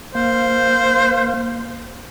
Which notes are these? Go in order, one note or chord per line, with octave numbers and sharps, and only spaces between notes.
A#3 C5 F5